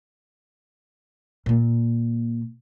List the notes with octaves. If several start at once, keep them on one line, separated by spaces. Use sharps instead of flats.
A#2 A#3